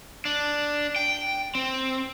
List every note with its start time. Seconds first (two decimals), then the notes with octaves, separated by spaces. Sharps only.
0.25 D4
0.96 G5
1.55 C4